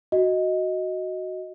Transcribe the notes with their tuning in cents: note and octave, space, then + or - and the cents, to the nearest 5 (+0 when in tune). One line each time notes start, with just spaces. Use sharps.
F#4 +0 D#5 +10